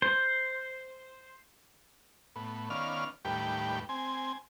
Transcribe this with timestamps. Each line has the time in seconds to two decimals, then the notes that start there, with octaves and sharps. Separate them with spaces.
0.02 C5
2.36 A2 B3
2.70 D#3 B3 C#4 D5 F5 F6
3.25 D#2 A2 G3 G4 B4 G5
3.89 C4 G#5